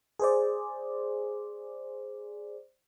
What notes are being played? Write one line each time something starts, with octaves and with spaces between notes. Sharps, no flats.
G#4 C5 D5